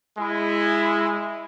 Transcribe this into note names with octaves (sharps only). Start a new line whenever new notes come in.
G#3 E4